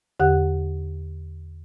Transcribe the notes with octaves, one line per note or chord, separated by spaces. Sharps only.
E2 D3 G4 F#5 F#6